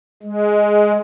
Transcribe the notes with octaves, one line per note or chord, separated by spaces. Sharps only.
G#3